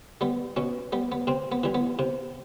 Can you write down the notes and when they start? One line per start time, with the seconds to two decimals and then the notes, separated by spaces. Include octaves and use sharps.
0.21 G3 B3
0.56 B2 C#4
0.92 G3 B3
1.12 B3
1.27 C3 C4
1.52 B3
1.63 E3 G3
1.74 B3
1.99 C3